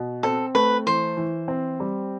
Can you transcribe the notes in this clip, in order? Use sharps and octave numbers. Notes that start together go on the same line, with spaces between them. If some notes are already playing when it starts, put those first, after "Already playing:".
Already playing: B2
C4 A4
A3 B4
E3 C5
E3
C4
G3